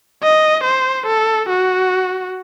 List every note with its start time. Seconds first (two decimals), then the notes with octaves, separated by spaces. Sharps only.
0.23 D#5
0.64 C5
1.07 A4
1.50 F#4